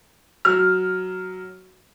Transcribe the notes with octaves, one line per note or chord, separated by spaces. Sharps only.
F#3 F6